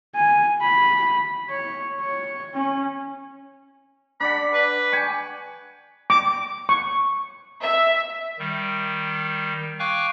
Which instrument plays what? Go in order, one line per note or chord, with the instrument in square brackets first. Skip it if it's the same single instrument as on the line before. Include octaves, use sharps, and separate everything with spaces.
[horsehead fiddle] G#5
B5
C#5
C#5
C#4
[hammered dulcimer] D4 D5 F#5 [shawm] B5
[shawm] B4
[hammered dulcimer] G5 G#5 C#6
[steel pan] D6
C#6
[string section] E5
[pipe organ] D#3 G3
F5 G5 G#5 C#6 D6 F#6